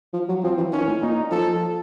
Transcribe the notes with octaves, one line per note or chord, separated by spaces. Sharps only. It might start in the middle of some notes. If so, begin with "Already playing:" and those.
F3
F#3
F3 C4
E3
D#3 C#4
A2
A#2 D#4
F3 A4